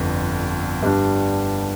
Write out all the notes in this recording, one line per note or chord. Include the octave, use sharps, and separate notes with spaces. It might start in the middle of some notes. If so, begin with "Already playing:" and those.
Already playing: G1 F2 D3
G2 G3 D4